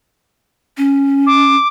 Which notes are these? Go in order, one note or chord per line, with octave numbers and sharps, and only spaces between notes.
C#4
D6